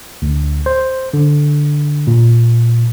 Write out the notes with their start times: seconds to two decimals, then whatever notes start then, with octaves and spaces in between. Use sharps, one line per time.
0.22 D2
0.66 C5
1.13 D3
2.07 A#2